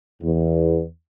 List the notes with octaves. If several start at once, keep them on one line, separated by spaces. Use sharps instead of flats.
E2